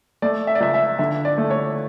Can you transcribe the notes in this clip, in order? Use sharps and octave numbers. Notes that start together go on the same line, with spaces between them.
A3 D5
E5
D5
C#2 E5
E5
D3 E5
D5
A3
C#5